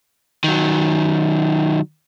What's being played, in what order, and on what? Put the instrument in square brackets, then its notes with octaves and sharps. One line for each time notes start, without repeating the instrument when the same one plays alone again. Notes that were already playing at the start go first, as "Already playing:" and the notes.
[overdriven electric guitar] D#3 F#3